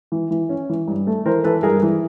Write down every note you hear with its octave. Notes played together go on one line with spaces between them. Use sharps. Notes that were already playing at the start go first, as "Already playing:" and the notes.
E3
E3
C#4
E3
G2
A3
E3 A#4 C5
E3 A4 B4
G2 G#4 A#4
E3